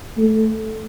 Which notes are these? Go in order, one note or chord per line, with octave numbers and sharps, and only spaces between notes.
A3